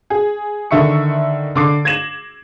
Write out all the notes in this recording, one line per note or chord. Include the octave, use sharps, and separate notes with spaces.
G#4
D3 D#3 E5 C#6 C#7
D3 D6 C7
G#6 A#6 E7 F#7